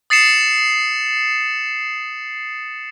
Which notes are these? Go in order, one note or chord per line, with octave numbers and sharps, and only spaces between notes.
D#6 A6 C7 C#7 E7